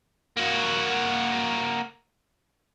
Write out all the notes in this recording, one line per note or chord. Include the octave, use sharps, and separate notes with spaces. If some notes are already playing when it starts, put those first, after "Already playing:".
A#3 F#4